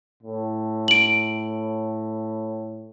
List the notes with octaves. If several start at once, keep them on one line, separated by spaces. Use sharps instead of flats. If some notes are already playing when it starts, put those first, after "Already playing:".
A2
D7 F#7